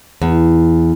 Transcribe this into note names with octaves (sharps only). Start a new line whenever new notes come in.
E2